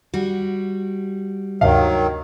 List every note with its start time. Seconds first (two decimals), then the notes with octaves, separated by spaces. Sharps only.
0.14 G3 F#4
1.61 D2 G2 C3 D#3 F#3 F5